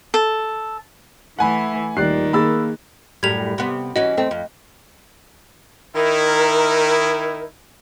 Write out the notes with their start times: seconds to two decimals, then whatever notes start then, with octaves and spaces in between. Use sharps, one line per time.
0.14 A4
1.39 E3 A3 F#5 G#5 B5
1.97 D#1 D#3 G4 D5 F#6 C7
2.33 A#3 G#4 A#4 B5 E6 A6
3.23 F#2 A2 G3 G#6 F7
3.58 C3 B3
3.96 E3 C#4 F#4 D#5
4.17 E2 A3 C4
4.31 F2
5.95 D#3 D#4 E4 A#4